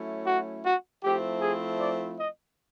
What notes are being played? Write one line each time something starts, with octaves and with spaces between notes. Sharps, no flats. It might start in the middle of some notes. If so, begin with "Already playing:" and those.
Already playing: F#3 A3 C#4 E4
F#4
F#4
F3 A3 C4 E4 G4
G#4
D5
D#5